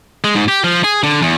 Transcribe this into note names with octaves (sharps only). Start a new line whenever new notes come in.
G#3
G#2
G4
F3
G#4
D3
E2